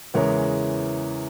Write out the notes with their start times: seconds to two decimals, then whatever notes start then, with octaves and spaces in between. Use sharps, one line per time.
0.14 E2 C#3 E3 G#3 A#4 C#5